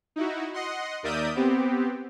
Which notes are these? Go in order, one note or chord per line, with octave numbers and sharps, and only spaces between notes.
D#4 E4 F#4
D#5 F#5 C6
D#2 A#4 D5 E5 D#6 G6
B3 C4 G4